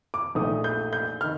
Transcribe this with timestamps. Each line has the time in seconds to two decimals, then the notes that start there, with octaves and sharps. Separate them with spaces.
0.14 D6
0.35 A#1 A#2 A3 D#4 D#6
0.64 G6
0.93 G6
1.21 D#3 F6